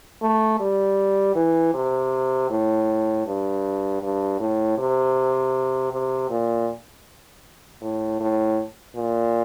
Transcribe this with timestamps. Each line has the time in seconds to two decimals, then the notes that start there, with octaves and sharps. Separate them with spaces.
0.22 A3
0.60 G3
1.35 E3
1.74 C3
2.50 A2
3.26 G2
4.02 G2
4.40 A2
4.78 C3
5.92 C3
6.30 A#2
7.81 A2
8.20 A2
8.96 A#2